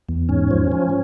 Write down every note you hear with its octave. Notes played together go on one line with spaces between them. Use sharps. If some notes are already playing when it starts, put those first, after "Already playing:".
E2
G#2 C#4
F3
F3